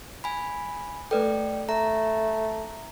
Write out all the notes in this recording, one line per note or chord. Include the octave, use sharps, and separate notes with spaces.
G#5 B5
A3 A4 B4 D5 G5
A3 A#5